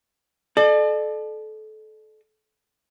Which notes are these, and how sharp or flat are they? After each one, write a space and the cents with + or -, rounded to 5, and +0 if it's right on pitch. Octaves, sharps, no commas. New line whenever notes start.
A4 -25 D5 +40